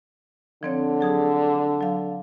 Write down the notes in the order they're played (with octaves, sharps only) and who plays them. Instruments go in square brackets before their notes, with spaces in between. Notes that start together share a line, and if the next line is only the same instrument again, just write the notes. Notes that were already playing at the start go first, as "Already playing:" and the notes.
[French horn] D3 [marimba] F3 C4 C#5
[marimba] F#3 G#4 D#6
F#3 F5